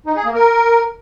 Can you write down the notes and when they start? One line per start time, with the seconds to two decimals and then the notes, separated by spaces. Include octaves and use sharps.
0.06 D#4
0.15 G#4
0.25 A#3
0.34 A#4